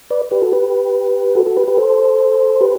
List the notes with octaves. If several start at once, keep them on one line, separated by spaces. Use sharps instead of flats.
B4 D5
G4 B4
F#4 A4
G4 B4
F#4 A4
F#4 A4
G4 B4
G4 B4
A4 C5
G4 B4